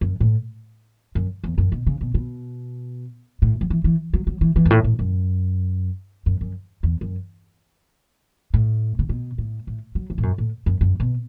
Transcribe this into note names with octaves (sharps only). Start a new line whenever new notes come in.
F#2
A2
F#2
E2
F#2
B2
C#3
B2
B2
A2
F#3
E3
E3
F#3
F#3
E3
E3
F#2
A2
A2
F#2
F#2
F#2
E2
F#2
A2
C#3
B2
A2
A2
F#3
E2
A2
F#2
A2
F#2
F#2
B2